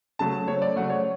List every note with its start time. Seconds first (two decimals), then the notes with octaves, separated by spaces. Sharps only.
0.19 C#3 F#3 A3 A5
0.47 C#3 F#3 A3 C#5
0.62 D5
0.76 C#3 F#3 A3 F#5
0.90 C#5